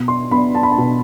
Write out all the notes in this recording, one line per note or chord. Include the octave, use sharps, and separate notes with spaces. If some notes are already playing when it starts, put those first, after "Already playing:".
Already playing: B2
C6
B3 D4 B5
A5
B5
A5
B2